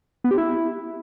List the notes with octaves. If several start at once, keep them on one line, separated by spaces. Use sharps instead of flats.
B3
G4
E4